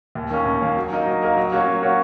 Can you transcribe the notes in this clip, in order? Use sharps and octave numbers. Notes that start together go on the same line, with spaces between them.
D#2
D#3 A#3 C#4
D#2
D#3 A#3 C#4
F#3
A#3 D#4 A#4 D#5
F#3
A#3 D#4 A#4 D#5
F#3
A#3 C#4 F#4 C#5
F#3
A#3 C#4 F#4 C#5